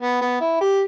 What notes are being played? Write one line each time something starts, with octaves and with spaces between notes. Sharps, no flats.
B3
B3
E4
G4